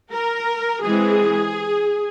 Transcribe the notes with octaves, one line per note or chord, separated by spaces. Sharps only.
A#4
E3 G#3 C4 G#4